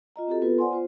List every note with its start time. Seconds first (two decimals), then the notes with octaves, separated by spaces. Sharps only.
0.16 F4 D#5 A#5
0.27 C4 F#4 G4 A4
0.42 B3 F4 A4 B4
0.58 C5 D5 F#5 G#5 C6
0.71 B3 F4 C5